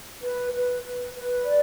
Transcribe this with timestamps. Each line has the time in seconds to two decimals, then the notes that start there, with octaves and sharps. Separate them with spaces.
0.21 B4
0.52 B4
0.83 B4
1.14 B4
1.44 D5